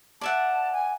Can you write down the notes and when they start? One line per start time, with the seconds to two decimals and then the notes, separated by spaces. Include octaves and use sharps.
0.21 D5 E5 F#5 A5
0.72 G#5